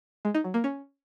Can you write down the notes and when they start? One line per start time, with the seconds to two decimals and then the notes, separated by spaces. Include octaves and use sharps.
0.25 G#3
0.35 D#4
0.44 F#3
0.54 A#3
0.64 C#4